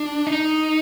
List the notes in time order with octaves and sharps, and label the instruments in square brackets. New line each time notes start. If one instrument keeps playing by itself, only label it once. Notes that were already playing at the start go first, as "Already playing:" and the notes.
Already playing: [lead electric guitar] D4
D#4